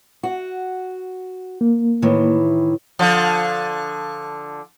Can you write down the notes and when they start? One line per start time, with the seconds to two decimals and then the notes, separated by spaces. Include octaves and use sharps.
0.23 F#4
1.61 A#3
2.02 A2 D#3 E3
2.99 D3 F3